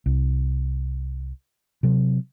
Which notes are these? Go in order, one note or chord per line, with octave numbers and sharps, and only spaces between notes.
C2
C3 F#3